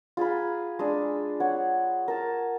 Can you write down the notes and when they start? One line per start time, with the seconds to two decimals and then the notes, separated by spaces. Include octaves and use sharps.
0.17 F4 G#4 A#5 B5
0.79 G#3 D4
1.40 C#5 F#5
2.08 A#4 A5